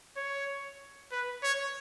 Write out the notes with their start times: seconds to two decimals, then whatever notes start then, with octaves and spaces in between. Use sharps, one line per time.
0.17 C#5
1.12 B4
1.43 C#5